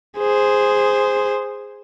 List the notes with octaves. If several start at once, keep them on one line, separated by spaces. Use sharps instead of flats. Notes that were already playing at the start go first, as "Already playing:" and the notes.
G#4 C5